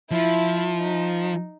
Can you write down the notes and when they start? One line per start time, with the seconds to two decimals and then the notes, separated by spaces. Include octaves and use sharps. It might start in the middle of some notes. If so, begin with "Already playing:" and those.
0.11 F3 E4
0.79 D#4